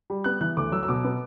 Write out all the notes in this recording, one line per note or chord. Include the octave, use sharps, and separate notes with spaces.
G3
B3 F#6
E3 F#6
D2 D6
F#3 E6
E6
B2 D6
B3